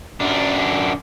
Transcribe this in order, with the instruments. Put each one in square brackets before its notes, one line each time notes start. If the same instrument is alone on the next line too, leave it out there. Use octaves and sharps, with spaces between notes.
[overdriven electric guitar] F#2 D4